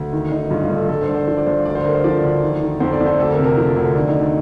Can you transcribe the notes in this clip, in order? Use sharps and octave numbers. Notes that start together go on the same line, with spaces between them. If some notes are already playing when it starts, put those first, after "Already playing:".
Already playing: D2
D#3
D#3 D#4
G2 F4
F4
G2
A4
G2 A4
C5
D3 D5
C5
F3 C5
D5
G2 C5
D2 D5
C5
D3 A#4
C5
F3 D5
D2
D#3
D#3
F2 C5
D5
F2
C5
D2 A4
A#4
C3
A#4
F3
D2
D#3 D4
D#4
D#3
D4